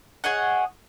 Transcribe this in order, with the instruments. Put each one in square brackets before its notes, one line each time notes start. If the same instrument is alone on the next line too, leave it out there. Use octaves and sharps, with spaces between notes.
[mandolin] G#4 C#5 D#5 F#5